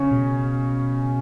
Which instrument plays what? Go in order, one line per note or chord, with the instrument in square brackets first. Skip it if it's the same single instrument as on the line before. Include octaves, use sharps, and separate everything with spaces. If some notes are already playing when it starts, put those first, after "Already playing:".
Already playing: [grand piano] C#3 C#4
[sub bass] B2